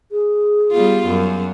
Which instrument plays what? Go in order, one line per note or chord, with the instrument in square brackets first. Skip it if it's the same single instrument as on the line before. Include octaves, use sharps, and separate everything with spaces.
[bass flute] G#4
[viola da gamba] G3 B3 F4
F#2